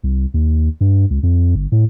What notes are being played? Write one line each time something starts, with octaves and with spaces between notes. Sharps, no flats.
C2
D#2
G2
C#2
F2
G1
A2